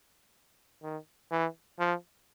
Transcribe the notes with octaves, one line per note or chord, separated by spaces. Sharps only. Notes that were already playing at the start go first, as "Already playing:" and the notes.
D#3
E3
F3